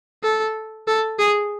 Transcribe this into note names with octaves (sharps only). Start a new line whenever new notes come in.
A4
A4
G#4